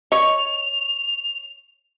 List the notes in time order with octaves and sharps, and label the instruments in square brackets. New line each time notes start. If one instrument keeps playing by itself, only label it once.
[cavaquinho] C#5 C#6 [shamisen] D#5 [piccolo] F7